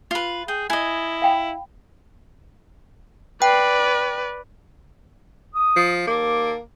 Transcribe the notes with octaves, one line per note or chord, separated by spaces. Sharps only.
F4 B4
G#4 G5
E4 D#5 G#5
F5 G5 B5
B4 D5 G5
D#6
F3
D#2 A#3 A4 D6